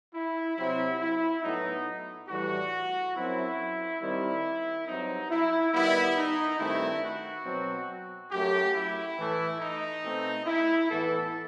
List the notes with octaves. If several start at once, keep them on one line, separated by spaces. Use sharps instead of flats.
E4
C3 F#3 C4 E4
E4
A2 F#3 B3 D#4
A2 E3 G3 F#4
F#2 F#3 C4 E4
D#3 G3 C4 E4
G2 F#3 C4 D#4
E4
D#3 G3 B3 E4
D#4
G2 D#3 A3 C4 E4
F#4
B2 F#3 C4
F#2 F#3 A3 G4
E4
A2 E3 A3
D#4
B2 A3 C4
E4
A2 E3 B3 A4